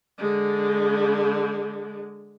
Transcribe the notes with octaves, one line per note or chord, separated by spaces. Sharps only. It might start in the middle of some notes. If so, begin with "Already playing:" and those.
D3 G#3